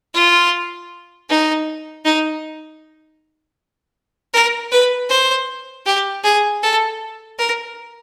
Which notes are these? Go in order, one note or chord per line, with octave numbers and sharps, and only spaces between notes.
F4
D#4
D#4
A#4
B4
C5
G4
G#4
A4
A#4